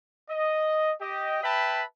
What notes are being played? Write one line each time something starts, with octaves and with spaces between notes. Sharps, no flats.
D#5
G4 D#5
B4 E5 G5 A5 B5